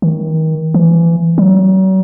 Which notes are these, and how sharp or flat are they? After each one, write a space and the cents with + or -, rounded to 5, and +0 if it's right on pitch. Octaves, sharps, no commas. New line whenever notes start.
D#3 +30
E3 +25
F#3 +40